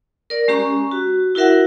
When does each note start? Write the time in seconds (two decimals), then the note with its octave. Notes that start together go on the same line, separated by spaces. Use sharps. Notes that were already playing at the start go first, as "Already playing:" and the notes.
0.30 A#4 D5
0.48 G#3 C#4 G4 A#5 C#6
0.91 F#4
1.35 E4 F#4 A#4 E5 F#5